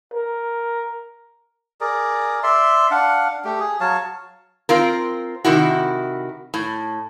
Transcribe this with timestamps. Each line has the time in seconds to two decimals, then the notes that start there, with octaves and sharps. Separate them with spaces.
0.14 A#4
1.81 G#4 A#4 D5
2.43 D5 E5 C6
2.91 D4 F5 F#5
3.45 A3 G4
3.60 G#4
3.80 F#3 C#5 F5 A5
4.69 C4 F4 A#4
5.45 C3 D#3 E4 F#4
6.54 A2